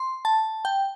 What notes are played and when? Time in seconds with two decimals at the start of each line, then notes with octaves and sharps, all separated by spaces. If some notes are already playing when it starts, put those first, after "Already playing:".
Already playing: C6
0.25 A5
0.65 G5